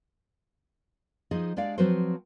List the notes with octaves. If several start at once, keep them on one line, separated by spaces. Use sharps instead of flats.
F3 D#4 G#4 D#5
G#3 D4 G4 D5 F5
F3 F#3 C4 F#4 B4 C5